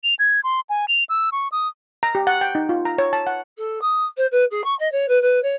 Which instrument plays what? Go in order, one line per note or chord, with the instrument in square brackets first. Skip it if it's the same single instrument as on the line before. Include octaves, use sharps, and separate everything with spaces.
[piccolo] F7
G#6
C6
G#5
F7
E6
C#6
D#6
[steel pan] A#5
G4
F#5
G5
D#4
F4
A#5
C#5
A5
F#5
[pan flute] A4
D#6
C5
B4
G#4
C#6
D#5
C#5
B4
B4
C#5